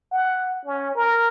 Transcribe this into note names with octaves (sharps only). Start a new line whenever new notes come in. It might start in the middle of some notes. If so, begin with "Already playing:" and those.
F#5
C#4
A#4